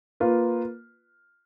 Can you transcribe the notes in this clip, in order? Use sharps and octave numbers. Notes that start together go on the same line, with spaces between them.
A#3 F4 B4